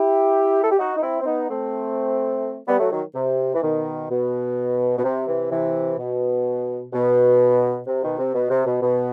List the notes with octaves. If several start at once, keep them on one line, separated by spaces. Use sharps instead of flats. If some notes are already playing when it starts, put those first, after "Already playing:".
Already playing: E4 G4
A4
G4
D#4 F#4
D#4
C4 E4
C4
B3 D#4
A3 C4
G3 B3
F#3 A3
D#3 F#3
C3
E3
B2 D#3
B2
B2
C3
C3 E3
C3 E3
B2
B2
C3
B2 D#3
C3
B2
C3
B2
B2